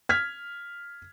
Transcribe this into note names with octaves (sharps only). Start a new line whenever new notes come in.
F6 G#6 B6